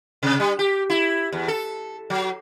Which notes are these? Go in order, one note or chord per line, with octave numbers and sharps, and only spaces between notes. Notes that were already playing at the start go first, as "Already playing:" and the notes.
C3
G3
G4
E4
E2
A4
F#3